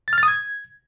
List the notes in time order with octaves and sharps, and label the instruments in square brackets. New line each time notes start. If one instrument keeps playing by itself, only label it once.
[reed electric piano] A6
F6
A6
D#6
G#6